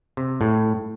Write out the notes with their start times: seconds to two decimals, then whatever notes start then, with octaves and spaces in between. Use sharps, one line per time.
0.17 C3
0.41 A2